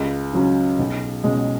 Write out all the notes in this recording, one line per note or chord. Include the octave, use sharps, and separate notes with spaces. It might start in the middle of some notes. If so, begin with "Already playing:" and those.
Already playing: C#2
C#3 F#3 C#4
B1
B2 G#3 C#4